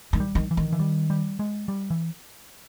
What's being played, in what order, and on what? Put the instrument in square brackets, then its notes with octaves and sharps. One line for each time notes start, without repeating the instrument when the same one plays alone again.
[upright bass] D#3
[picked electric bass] G3
[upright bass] D#3
[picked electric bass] E3
[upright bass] D#3
[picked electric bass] E3
G3
G3
G#3
G3
E3